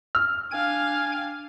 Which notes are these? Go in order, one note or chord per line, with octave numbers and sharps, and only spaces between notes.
F6
D4 F5 G5 G#5 G#6